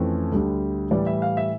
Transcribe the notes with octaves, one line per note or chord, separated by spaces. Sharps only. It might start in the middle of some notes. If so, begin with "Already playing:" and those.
Already playing: F2 E3 A3 C#4
D2 D3 G3
A2 E3 G3 D5
E5
F5
E5